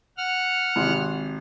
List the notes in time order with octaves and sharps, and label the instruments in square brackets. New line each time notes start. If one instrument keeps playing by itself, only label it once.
[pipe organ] F#5 F6
[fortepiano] G#1 C3 C6